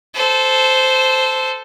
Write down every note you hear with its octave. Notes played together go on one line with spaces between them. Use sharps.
A4 C5